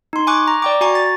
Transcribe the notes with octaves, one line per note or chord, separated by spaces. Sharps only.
D#4 C6
G#5 C#6 D6 F#6
A#5
D5 G5 D6
F#4 G#5 A#5 C#6
A6